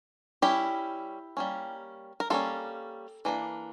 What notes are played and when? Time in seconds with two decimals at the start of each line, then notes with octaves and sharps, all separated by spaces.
0.42 G3 C#4 E4 G4
1.37 G3 A#3 C#4
2.20 A#4
2.30 G3 A#3 C#4 F4 A4
3.25 E3 A#3 D4